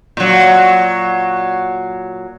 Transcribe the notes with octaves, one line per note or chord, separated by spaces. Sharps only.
A#2 F#3